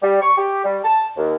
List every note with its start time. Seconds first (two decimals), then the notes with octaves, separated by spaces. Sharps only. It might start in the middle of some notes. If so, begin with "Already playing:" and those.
0.03 G3
0.21 C#6
0.38 G4
0.64 G3
0.84 A5
1.17 D#2